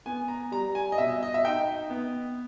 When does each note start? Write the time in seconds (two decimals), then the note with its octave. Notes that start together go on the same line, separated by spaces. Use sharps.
0.06 B3 G#5
0.28 A#5
0.51 G3 A#5
0.75 G#5
0.92 D#5
0.98 B2 E5
1.23 D#5
1.34 E5
1.44 D#4 G5
1.90 B3